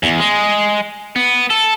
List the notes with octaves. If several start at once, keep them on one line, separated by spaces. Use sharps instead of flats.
E2
G#3
B3
A4